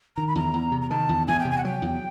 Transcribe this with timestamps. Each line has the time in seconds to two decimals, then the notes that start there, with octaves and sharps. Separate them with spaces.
0.16 D#3 A#5
0.27 B5
0.35 E2 A#5
0.54 E2
0.72 C3
0.82 A#5
0.90 D#3 A5
1.09 E2
1.28 E2 G#5
1.40 G5
1.45 C3
1.51 G#5
1.58 F#5
1.65 F#3 G5
1.82 E2